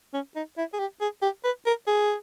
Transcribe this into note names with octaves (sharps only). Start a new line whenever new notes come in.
C#4
D#4
E4
G#4
G4
G#4
G4
B4
A#4
G#4